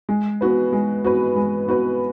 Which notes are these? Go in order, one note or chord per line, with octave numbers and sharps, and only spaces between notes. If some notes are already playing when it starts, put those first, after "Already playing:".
G#3
B3 F#4 B4
G#3
B3 F#4 B4
G#3
B3 F#4 B4